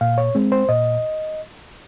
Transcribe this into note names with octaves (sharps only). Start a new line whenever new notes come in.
A#2 F5
C#5
G#3 C4
C5
A#2 D#5